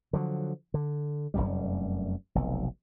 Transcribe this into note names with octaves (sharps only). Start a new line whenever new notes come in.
D3 F3 F#3
D3
F1 C#2 F#2 G3
F1 B1